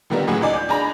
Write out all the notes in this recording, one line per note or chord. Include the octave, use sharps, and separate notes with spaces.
A#2 D3 D#3 G3 A#3 B3
A2 C#3 F#3 G#4 F#5
C#2 D#4 D5 G#5
G6
D4 G#4 G#5 A#5 B5